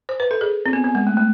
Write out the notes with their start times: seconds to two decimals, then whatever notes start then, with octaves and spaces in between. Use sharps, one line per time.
0.09 C5
0.20 B4
0.31 A4
0.41 G#4
0.66 C4
0.73 B3
0.84 B3
0.95 G#3
1.07 A3
1.17 A3